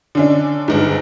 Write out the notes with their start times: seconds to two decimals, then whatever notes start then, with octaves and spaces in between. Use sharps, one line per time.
0.15 D3 C#4 D4
0.68 G1 G#2